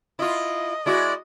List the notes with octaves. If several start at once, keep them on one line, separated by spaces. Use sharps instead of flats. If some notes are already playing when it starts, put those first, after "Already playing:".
E4 F4 D#5
G#3 E4 F#4 D5